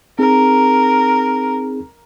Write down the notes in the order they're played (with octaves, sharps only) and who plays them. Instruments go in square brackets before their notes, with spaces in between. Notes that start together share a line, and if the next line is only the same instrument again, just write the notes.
[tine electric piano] C4 D#4 G#4 [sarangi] A#4